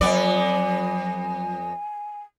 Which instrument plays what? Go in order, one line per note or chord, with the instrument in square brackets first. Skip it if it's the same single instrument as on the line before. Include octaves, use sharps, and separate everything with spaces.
[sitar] F2 B3 D5 [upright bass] F#3 [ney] G#5